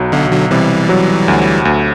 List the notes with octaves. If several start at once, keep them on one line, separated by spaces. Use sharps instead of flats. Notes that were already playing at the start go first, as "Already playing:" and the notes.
Already playing: B1 F#3
B1 B2 D3
D3 F#3
C3 E3 G3
F#3
D2
D2